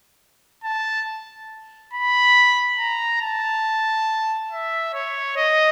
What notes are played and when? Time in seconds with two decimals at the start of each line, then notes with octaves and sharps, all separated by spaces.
0.64 A5
1.93 B5
2.79 A#5
3.21 A5
4.51 E5
4.94 C#5
5.36 D#5